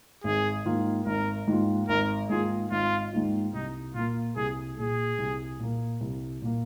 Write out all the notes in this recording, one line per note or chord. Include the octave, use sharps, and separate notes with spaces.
G#1 G#4
G#2 D#3 A#3 F4
G#1 A#4
G#2 D#3 A#3 F4
G#1 A#4
G#2 D#3 A#3 F4 G#4
G#1 F4
G#2 D#3 A#3 F4
C2 D#4
A#2 A#3 F4
C2 G#4
A#2 A#3 G#4
C2
A#2 A#3
C2
A#2 A#3